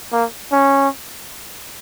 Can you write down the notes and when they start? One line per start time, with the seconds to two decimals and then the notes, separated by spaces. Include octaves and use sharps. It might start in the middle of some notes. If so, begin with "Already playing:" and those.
0.12 A#3
0.52 C#4